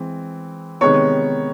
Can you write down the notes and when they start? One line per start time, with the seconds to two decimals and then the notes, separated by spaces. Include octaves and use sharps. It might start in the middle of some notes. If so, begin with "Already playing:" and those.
Already playing: E3 G#3 C4
0.81 C3 D#3 G#3 B3 C#5 C#6